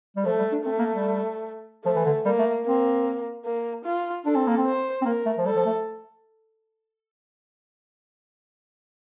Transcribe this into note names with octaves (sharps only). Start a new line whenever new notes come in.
G3
F3 A3
G3
D4
A3 C4
A#3
G3
F3 A3
E3
D3
G3 A#3
A3
A#3 C4
A#3
F4
D4 A4
C4
A#3
C4
C5
C4
A#3 A#4
A3
F3
G3 A4
F3
A3